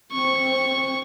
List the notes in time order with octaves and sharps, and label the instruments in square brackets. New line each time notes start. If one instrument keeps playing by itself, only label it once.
[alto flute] C4 [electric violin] C#6